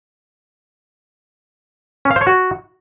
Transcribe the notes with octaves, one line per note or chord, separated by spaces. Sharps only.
C#4
F5
C5
C#5
F#4